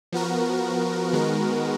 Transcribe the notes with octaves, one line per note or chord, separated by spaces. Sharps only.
F3 B3 F#4 A#4
D#3 G#3 B3 F#4 A#4